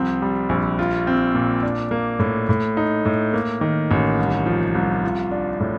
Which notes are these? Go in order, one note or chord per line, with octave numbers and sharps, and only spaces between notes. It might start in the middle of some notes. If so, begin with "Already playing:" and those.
Already playing: C2 F3 C4
G3
A#1
F4
C4
A#2
D4
A#3
A2
A2
D#4
A2
A#3
D#3
A1
C2
F3
C2
F4
D4
A2